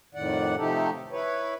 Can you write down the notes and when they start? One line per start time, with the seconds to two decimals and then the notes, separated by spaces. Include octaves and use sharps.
0.15 F2 A2 D#3 D5 F#5
0.57 C3 F3 A3 D#4 G4 A4
1.11 E4 B4 C#5